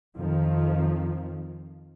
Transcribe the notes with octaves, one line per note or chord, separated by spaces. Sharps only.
F2 D#3 F3